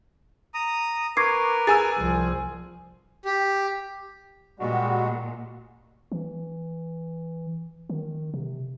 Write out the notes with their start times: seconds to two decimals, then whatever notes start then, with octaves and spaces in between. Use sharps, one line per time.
0.54 A#5 D#6
1.17 A#4 B4 C#6 D6 G#6 C7
1.67 G#4 G#5 E6 A6
1.98 C2 F3
3.25 G4
4.60 A#2 G3 G#3 F#4
6.12 E3
7.90 D#3
8.34 C3